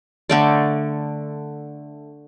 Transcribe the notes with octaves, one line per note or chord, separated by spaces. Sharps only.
D3 A3 D5